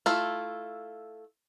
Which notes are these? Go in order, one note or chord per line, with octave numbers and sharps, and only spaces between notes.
A3 E4 F4